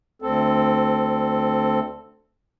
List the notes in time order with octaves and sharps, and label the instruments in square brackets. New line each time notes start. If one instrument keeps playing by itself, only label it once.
[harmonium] D2 C4 A4